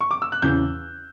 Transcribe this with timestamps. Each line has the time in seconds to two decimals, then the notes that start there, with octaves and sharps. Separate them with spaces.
0.01 C#6
0.11 D6
0.22 E6
0.32 F#6
0.42 E2 C#3 E3 G6